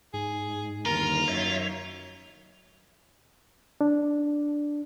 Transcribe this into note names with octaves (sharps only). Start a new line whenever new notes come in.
G#2 G#4
G1 D#2 F4 A#4
F#2 D#4 C#5 E5
D4